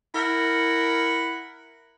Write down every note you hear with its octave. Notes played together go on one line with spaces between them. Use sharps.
E4 A#4 F#5